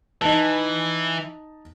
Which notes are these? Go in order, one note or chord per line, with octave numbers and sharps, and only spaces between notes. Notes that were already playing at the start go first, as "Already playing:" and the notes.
E3 D#4 A5